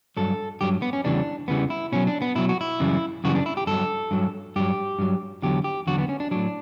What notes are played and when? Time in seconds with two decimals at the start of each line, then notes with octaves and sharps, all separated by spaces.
0.17 G2 F#3 A4
0.61 G2 F#3 G4
0.82 B3
0.93 C#4
1.04 E2 C#3 E3 G3 D4
1.48 E2 C#3 E3 G3 B3
1.70 E4
1.92 B2 F#3 C#4
2.07 D4
2.22 B3
2.35 B2 F#3 E4
2.49 F#4
2.61 E4
2.80 F#2 C#3 E3 G3
3.24 F#2 C#3 E3 G3 F#4
3.35 D4
3.46 E4
3.57 G4
3.67 G2 F#3 A4
4.11 G2 F#3
4.56 G2 F#3 G4
4.99 G2 F#3
5.43 E2 D3 F#3 G4
5.64 G4
5.87 E2 D3 F#3 F#4
5.98 B3
6.09 C#4
6.20 D4
6.31 A2 F#3 D4